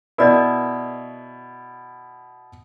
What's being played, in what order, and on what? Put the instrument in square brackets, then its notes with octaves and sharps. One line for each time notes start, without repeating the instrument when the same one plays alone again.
[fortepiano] B2 E4 [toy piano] A#4 D5 D#5